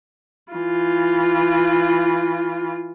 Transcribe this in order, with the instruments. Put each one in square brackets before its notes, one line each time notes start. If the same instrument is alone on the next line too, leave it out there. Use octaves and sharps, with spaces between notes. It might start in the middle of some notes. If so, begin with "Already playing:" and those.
[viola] E3 F4